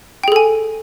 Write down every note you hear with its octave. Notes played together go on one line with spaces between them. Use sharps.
G#4 A4 G5 G#5